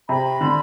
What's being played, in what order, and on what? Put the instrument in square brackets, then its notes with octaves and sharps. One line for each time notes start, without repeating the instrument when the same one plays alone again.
[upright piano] C3 [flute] B5
[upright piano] D3